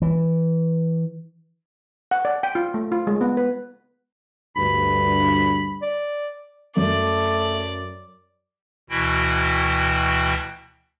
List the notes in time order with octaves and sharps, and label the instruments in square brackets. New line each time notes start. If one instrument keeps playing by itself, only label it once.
[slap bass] E3
[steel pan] F#5
D5
G5
F4
A3
F4
G#3
B3
B4
[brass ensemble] D2 G2 [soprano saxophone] B5
[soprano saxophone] D5
[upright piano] F#2 [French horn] A3 [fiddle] D5
[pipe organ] D2 B2 E3 E4 F#4 G5